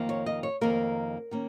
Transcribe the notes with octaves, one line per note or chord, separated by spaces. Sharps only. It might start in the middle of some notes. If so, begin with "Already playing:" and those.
Already playing: F2 D#3 A#3
C#5
D#5
C#5
F2 D#3 A#3 A#4
D#3 A#3 C#4